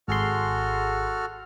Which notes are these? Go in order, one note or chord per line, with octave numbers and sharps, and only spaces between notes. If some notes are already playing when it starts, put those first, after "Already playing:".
G#1 F#4 G#4 A4 C6 F6